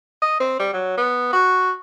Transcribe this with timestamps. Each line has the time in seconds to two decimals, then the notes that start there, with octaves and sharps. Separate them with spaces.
0.22 D#5
0.40 C4
0.59 G3
0.73 F#3
0.97 B3
1.33 F#4